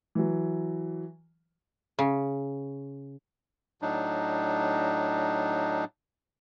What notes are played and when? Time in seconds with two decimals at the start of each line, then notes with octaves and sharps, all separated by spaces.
0.15 E3 F#3
1.99 C#3
3.82 A2 F#3 D4 D#4